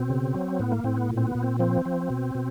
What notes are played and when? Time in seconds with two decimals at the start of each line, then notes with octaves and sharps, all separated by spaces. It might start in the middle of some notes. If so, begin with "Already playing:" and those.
Already playing: B2 C4
0.09 C#3
0.34 F#3
0.59 A2 B3
0.72 A#3
0.84 A2 C4
0.97 B3
1.10 A#2
1.17 C4
1.27 B3
1.35 A#2
1.43 C4
1.59 F3 C4
1.85 F3
2.10 B2
2.35 B2